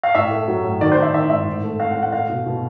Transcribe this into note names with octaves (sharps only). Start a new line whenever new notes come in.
F5
A2 E5
A3
F#3
A2
D#3 D5
C5
D#3
E5
D#3 E5
G#2 E5
A2
A3
A3 F5
F#5
A2
F#5
A3 F5
B2
B2